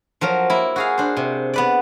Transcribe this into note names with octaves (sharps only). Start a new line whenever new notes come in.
F3 F#3 A#4
A#3 E4
F#4 G#4 F5
D4 C5
C3
B3 B4 D5